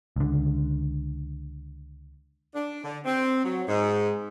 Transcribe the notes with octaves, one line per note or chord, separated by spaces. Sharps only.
C#2 D3
D4
D3
C4
F#3
G#2